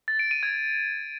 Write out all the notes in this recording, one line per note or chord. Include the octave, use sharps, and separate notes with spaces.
A6
D7
D#7
G#6